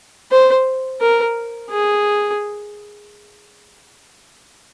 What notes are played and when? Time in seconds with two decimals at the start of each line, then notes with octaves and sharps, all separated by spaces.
0.31 C5
1.01 A#4
1.70 G#4